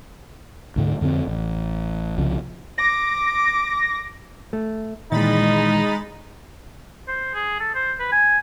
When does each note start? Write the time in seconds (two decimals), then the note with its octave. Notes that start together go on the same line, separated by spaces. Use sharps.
0.76 D2 G#2 D3
1.01 F2 D3 B3 C4
1.28 A1
2.18 C2 C#3 F3
2.78 D6 A#6
4.53 A3
5.12 A#2 D#3 E3 G#3 D#4 B5 A6
7.08 C5
7.34 G#4
7.60 A4
7.75 C5
7.99 B4
8.12 G#5